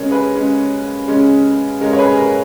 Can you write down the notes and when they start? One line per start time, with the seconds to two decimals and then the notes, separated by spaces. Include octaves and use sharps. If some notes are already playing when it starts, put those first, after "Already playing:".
Already playing: C#3 G#3 C#4 A#4 C#5
0.11 G#4 B4
0.36 C#3 G#3 C#4
1.08 C#3 G#3 C#4
1.81 C#3 G#3 C#4 A#4
1.93 C#5
1.98 G#4 B4
2.17 A#4